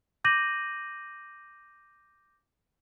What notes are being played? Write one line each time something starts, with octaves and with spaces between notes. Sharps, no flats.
D6 G6 A#6 D#7 F#7